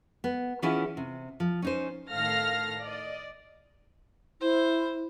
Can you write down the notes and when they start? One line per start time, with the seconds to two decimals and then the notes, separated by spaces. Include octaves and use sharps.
0.24 B3
0.62 E3 B3 C#4 E4 F4 G#4
0.97 C3
1.40 F3
1.62 C#4 D#4 C5
2.11 A2 D#3 A4 F5 F6 A#6
2.82 D5 D#5
4.41 E4 C5